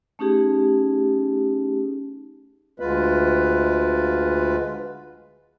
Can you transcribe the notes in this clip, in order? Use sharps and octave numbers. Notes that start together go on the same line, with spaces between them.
A3 C#4 D#4 G4 G#4
D2 G#3 F4 B4